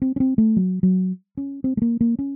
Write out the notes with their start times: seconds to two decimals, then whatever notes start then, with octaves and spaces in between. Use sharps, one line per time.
0.02 C4
0.16 C#4
0.20 C4
0.38 A3
0.56 F#3
0.83 F#3
1.37 C#4
1.64 C4
1.77 A3
1.82 A#3
2.01 A#3
2.19 C#4